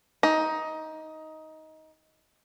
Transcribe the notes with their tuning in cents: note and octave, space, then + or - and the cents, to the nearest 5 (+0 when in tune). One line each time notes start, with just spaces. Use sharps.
D#4 +15